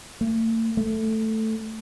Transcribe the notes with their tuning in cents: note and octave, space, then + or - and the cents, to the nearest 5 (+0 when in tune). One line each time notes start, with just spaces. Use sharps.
A3 +45
A3 +5